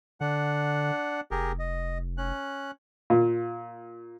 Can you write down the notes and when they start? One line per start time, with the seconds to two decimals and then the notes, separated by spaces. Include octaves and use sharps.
0.21 D3 D4 F#5
1.31 F1 G4 G#4 A#4
1.59 D#5
2.18 C#4 F#6
3.10 A#2